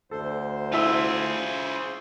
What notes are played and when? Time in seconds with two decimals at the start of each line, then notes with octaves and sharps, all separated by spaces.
0.11 D2 A4 C5
0.72 E4 F4 G#4 E5 E6